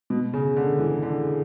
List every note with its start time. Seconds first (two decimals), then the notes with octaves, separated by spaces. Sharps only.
0.10 B2
0.33 C#3
0.57 D3
0.79 E3
1.02 D3